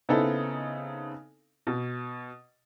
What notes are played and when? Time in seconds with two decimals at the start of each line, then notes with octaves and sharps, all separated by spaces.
0.09 C#3 B3 C4 D#4 E4 A4
1.67 B2